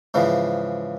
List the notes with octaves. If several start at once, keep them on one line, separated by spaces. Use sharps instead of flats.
G#2 C#3 E3 F3